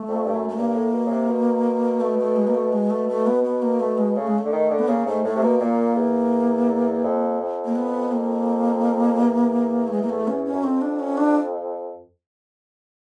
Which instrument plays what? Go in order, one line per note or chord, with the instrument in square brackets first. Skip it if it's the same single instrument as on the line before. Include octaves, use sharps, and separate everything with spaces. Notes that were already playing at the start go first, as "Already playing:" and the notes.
Already playing: [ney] A3
[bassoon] F2
G2
F#2
[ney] A3
[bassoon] G2 [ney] A#3
[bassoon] A2
B2
C#3
C3
B2
[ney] A3
A3
G#3
A#3
A3
[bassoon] B2 [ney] G#3
[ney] A3
A3
B3
B3
A#3
A3
G#3
[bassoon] C#3 [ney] A3
[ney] G#3
A3
[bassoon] D3
D#3
D3
[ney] B3
[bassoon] C#3 [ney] A#3
[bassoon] G#2 [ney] A3
[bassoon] A2 [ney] A3
[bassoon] C3
[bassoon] B2 [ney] A#3
[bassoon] A#2 [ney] A#3
[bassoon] E2
F2
F2
[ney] A#3
B3
A#3
[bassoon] E2
[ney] A3
G#3
A#3
A3
C#4
C#4
[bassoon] F#2
[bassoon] F2 [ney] C4
[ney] D4
C#4
D4